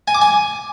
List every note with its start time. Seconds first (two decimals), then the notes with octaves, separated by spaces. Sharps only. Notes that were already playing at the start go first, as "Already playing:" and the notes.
0.08 G#5
0.15 D6
0.21 G#5